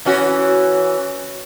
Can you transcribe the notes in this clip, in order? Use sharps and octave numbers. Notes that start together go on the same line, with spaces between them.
E3 C#4 F#4